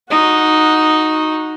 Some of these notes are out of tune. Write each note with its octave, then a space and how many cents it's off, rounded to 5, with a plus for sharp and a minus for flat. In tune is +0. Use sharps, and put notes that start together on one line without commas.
D#4 +0 F#4 -15